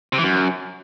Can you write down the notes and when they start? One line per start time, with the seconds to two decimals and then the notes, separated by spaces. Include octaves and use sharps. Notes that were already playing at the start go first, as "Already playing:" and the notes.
0.13 C3
0.18 E3
0.23 F#2